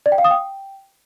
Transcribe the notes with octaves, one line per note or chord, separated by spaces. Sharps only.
D5
G5
F5
D#6
G5